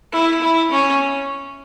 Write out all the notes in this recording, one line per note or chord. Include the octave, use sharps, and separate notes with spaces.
E4
E4
C#4